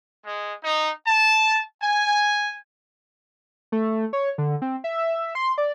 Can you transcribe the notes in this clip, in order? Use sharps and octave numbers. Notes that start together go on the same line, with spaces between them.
G#3
D#4
A5
G#5
A3
C#5
D3
C4
E5
C6
D5